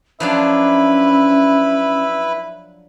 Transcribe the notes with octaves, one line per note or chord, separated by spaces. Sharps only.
F3 F#3 C#4 D4 E4 B4 E5 B5